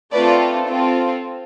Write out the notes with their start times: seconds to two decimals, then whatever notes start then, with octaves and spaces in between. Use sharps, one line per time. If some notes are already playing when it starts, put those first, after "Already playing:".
0.12 A3 C4 F4 A4 B4 D5
0.67 C4 F4 A4